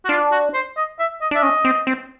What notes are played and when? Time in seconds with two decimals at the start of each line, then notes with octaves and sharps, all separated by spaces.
0.05 F#4
0.09 D4 F4
0.31 F#4
0.53 C5
0.76 D#5
0.99 E5
1.21 D#5
1.31 D4 E5
1.42 C#4 D#5
1.65 C4
1.87 C4